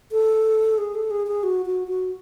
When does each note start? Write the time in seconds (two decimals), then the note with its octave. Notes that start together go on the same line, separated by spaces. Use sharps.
0.12 A4
0.78 G#4
0.94 A4
1.11 G#4
1.27 G#4
1.43 F#4
1.66 F#4
1.88 F#4